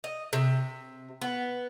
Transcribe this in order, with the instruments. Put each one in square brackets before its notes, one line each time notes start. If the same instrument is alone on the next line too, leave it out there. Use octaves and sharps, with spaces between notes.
[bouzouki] D#5
C3
B3